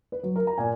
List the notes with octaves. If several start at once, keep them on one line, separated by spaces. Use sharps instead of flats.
B4
F#3
A#4
A#5
A#2 G#5